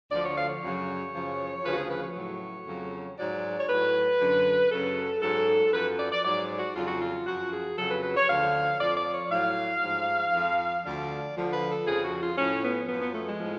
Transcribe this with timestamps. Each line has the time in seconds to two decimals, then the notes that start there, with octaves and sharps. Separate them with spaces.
0.12 D2 D3 F3 D5
0.24 C#5
0.37 F5
0.49 C#5
0.63 F#2 C#3 F#3
1.14 F#2 C#3 F3
1.64 D2 C#3 F3 B4
1.73 F#4
1.77 G#4
1.90 B4
2.04 C#5
2.16 A2 F#3
2.67 F2 C#3 F#3
3.18 G#2 F#3 D5
3.59 C#5
3.69 A2 F#3 B4
4.20 F#2 D3 F#3
4.72 F#2 C#3 F#3 A4
5.22 G#2 F#3 A4
5.73 F#2 F3 B4
5.99 D5
6.12 D5
6.25 G#2 F#3 D5
6.59 F#4
6.75 F2 C#3 F#3 F4
6.87 F#4
7.00 F4
7.27 F#2 F3 F#4
7.53 G#4
7.78 F2 C#3 F#3 A4
7.91 B4
8.03 B4
8.17 C#5
8.29 D2 D3 F3 F5
8.80 F2 F3 D5
8.97 D5
9.14 C#5
9.31 A2 F#3 F5
9.83 G#2 F3
10.34 F2 F3
10.85 D2 D3 F3 D5
11.36 D2 D3 F3
11.53 B4
11.70 A4
11.86 F2 C#3 F3 G#4
12.04 F#4
12.21 F4
12.38 A2 F3 C#4
12.63 B3
12.89 F#2 F3 B3
13.02 B3
13.14 A3
13.28 G#3
13.40 A2 F3